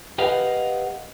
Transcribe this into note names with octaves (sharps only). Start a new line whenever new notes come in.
G4 A#4 B4 D#5 F5 F#5